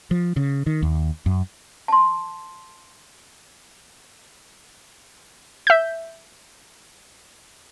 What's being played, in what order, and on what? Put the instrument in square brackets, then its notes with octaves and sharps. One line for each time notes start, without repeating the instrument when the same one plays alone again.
[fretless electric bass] F3
C#3
D#3
D#2
F#2
[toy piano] A5 C6
[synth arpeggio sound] E5 G6